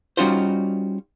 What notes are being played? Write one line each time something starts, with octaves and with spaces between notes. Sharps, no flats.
G3 C#4 D#4 F4 F#4 C5